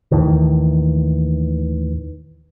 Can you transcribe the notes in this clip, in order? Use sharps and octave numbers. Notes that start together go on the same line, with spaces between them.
D#2 A2 D#3 E3